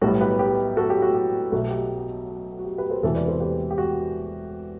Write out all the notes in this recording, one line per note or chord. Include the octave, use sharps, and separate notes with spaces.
B1 A2 G3 B3 F#4 A4
G4 B4
G4 B4
F#4 A4
G4
F#4
G4
B1 B2 A3 F#4 A4
G4
F#4
G4
G4 B4
A4 C5
E1 E2 C3 E3 F#4 A4
B4 D5
A4 C5
G4 B4
G4
F#4